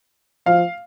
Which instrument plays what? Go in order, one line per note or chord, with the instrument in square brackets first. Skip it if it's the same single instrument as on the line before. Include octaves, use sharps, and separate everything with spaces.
[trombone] F3 [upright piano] F5